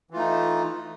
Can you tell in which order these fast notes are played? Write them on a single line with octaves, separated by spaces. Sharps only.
E3 F4 A3 D#4